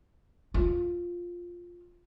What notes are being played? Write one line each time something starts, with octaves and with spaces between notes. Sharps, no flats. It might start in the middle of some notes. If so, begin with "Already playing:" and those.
F4